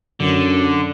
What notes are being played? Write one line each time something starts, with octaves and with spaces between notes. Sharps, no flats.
F#2 D3